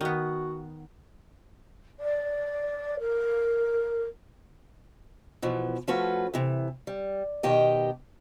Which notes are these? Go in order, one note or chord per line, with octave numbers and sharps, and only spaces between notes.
D#3 B3 F#4
D5
A#4
B2 E3 F3
F3 A3 C#4 F#4 B4
C3 E3
G3
B2 D#3 G4 D#5